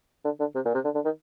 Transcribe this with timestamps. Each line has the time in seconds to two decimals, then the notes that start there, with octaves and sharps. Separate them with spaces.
0.25 D3
0.40 D3
0.55 C3
0.65 A#2
0.74 C3
0.84 D3
0.95 D3
1.05 D#3